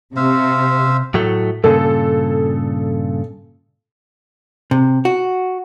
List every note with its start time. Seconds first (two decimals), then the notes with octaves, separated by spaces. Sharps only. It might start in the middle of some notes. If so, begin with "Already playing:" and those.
0.16 C3 C5 E5 F5
1.14 A2 F#3 A3
1.64 G2 A#2 C#3 A4
4.71 C3
5.05 F#4